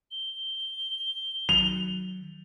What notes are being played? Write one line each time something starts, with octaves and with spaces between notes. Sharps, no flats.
G7
D#3 F#3 F7